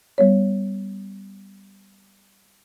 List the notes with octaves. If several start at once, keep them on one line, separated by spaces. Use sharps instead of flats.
G3 B3 C#5